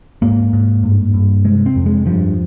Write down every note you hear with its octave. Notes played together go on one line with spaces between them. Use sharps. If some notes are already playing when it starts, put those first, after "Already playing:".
G#2 A#3
G#2
G2
G2
C3 G#3
C4
F2
G#3
G2 F3